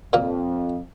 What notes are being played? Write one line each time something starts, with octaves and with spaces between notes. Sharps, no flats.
F2 A#2 A#3